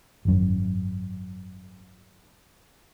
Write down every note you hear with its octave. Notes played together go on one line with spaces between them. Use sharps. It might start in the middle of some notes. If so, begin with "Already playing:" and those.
G#1 F#2